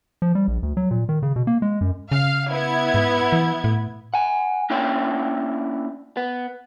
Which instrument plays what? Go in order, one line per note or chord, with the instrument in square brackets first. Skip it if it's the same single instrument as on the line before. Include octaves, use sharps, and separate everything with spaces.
[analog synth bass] F3
G3
A#1
D2
F#3
A#2
D#3
C#3
B2
A#3
G#3
F#2
[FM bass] C#3 [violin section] F5
[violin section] B3 E4 G#6
[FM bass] G#2
E3
A2
[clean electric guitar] F#5 G#5
A#3 C#4 D4 E4 C#5 G5
B3